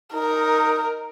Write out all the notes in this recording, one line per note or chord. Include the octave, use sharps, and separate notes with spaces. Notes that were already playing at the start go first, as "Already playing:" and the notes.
D#4 A#4